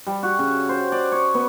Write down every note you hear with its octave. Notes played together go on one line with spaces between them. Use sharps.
G3
F#4
C#3
C5
D5
C#5
B3